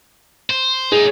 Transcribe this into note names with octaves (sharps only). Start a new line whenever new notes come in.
C5
A2 D#4 G#4